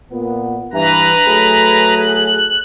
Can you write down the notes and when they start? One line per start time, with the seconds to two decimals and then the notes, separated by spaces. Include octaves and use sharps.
0.12 A#2 B3
0.73 G2 E3 B4 A#5
1.26 F#3 A3 G#4
1.99 F#6